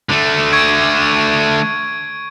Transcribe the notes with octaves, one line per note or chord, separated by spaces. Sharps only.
D3 A3
C#6 G#6 D7